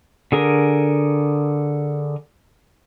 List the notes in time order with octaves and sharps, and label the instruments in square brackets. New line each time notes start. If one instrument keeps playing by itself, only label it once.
[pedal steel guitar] D3 G#4 A#4